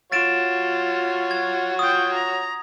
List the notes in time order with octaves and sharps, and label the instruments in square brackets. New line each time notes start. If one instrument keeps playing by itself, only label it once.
[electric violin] F4 [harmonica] F#4 C#5 [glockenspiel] A6 D7 E7
[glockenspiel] G#6
[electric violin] F4 G5 [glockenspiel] D#6
[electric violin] A#5